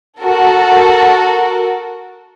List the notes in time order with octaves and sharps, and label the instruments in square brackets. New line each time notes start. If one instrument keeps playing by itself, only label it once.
[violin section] F#4 A4 A#4